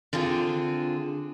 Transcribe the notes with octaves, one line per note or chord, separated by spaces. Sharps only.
D3 C4 F4 G#4